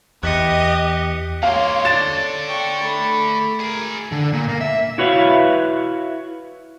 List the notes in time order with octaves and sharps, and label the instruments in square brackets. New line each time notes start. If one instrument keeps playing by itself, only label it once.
[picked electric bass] E2 [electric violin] G4 [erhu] D#5 [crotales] F#6 B6 C#7
[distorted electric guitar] G#2 A#3 [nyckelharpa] C#5 C6 [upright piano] F5
[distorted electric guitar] A4 D5 [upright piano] A6 E7
[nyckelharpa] G5 C#6
A3 B5
[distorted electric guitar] G#4 A#4
[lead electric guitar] D3
A#2
A#3
E5
[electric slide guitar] E4 F#4 B4 C#5 E5 F5